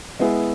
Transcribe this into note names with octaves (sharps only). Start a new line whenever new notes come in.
G#3 B3 E4 G#4